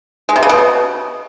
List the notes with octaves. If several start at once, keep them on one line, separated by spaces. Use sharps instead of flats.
G#3
C3
C#3
B2